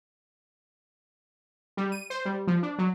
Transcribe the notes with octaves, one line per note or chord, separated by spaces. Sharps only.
G3
D#7
C5
G3
F3
D4
F#3